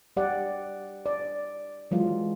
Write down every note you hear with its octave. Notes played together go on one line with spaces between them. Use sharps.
G3 G4 D5 F#5
D5
E3 F#3 G#3 F4